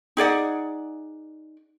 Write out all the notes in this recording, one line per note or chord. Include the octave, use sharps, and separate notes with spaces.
D#4 G#4 D5 F#5